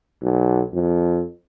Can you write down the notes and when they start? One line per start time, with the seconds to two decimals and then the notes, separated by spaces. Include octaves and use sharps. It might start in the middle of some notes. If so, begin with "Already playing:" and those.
0.22 B1
0.74 F2